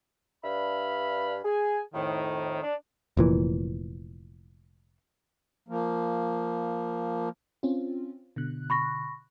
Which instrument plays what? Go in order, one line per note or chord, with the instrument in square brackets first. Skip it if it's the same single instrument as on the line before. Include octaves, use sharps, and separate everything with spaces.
[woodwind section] G2 D4 B4 E5 F5 B5
G#4 G#5
F2 A2 D#3
D4
[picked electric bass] F1 A#2 E3
[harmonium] F3 A#3
[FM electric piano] C4 C#4 F4
B2 D3 F#6
[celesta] B5 C#6 A#6